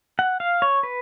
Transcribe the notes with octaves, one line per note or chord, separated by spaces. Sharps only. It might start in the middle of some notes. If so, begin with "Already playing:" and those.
F#5
F5
C#5
B4